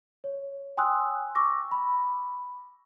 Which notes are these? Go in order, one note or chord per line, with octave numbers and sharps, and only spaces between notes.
C#5
G5 G#5 C6 D#6 E6 F#6
C#6 D6 E6 A#6
B5